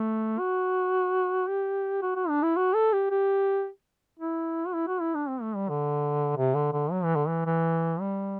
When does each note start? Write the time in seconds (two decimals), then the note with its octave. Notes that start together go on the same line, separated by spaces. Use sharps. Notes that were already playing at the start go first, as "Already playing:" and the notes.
Already playing: A3
0.39 F#4
1.48 G4
2.02 F#4
2.16 F#4
2.29 D4
2.43 E4
2.57 F#4
2.75 A4
2.93 G4
3.11 G4
4.19 E4
4.67 F#4
4.74 E4
4.87 F#4
5.01 E4
5.15 D4
5.28 C4
5.42 A3
5.56 G3
5.69 D3
6.37 C3
6.55 D3
6.73 D3
6.91 F#3
7.04 E3
7.16 D3
7.28 E3
7.46 E3
8.00 G3